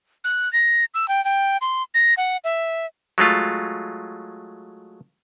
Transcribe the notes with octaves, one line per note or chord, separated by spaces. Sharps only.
F#6
A#6
E6
G5
G5
C6
A#6
F#5
E5
F#3 G#3 A3 F4